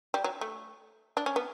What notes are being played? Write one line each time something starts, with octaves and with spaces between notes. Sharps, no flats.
G3
F#3
A3
D4
C#4
B3